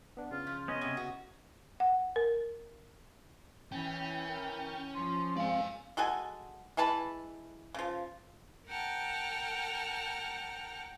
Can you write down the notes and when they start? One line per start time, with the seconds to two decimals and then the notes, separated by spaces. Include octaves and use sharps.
0.17 B3 D4
0.31 C#3 F4
0.47 F3
0.68 B3 C#4 D#5
0.81 C3 C#5
0.97 F#4
1.80 F#5
2.16 A#4
3.72 E3 C#4 G5
4.27 A#4
4.94 F3 C6
5.36 G#3 C4 D5 F5 G#5
5.97 G#3 F#4 A4 G#5
6.77 E3 G#3 A5 B5
7.74 C#3 F3
8.66 A#4 F#5 G5 A5 F6